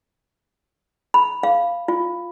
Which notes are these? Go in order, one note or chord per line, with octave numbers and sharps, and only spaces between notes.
B5
F5
F4